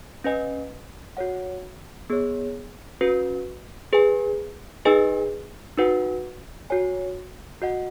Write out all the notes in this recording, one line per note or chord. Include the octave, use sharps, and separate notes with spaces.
C#4 B4 D#5 G#5
F#4 C#5 F#5
B3 G#4 C#5
C#4 F#4 B4
G#4 B4 G#5
D#4 G#4 B4 D#5 G#5
D#4 F#4 B4 F#5
F#4 C#5 G#5
F#4 D#5 F#5